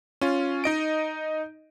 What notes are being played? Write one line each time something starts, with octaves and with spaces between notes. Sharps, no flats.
C#4 F4
D#4 D#5 D7